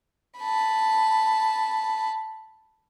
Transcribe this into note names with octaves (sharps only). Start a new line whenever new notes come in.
A5 B5